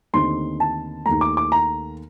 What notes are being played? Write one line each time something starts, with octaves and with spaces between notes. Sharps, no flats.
D#2 D3 A3 C4 D#4 C6
A5
D#2 D#3 A3 A#5
D6
D6
A#5